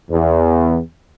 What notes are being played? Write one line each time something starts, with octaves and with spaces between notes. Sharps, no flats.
E2